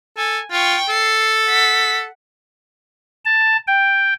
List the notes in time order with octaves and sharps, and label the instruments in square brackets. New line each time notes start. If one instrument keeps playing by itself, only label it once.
[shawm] A4 [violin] G#5
[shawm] F4 [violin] G5 C#6
[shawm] A4 [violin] C7
[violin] F#5 B6
[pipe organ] A5
G5